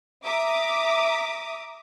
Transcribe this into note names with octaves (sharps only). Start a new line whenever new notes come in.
E5 A#5 D6 D#6